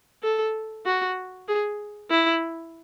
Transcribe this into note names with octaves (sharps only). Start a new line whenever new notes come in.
A4
F#4
G#4
E4